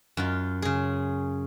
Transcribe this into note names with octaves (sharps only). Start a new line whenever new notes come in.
F#2 F4
C#3 G#4